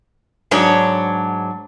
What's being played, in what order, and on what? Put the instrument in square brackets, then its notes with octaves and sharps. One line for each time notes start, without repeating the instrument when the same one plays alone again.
[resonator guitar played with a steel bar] G#2 F#3 D4 C#5